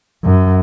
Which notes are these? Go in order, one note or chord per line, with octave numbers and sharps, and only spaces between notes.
F#2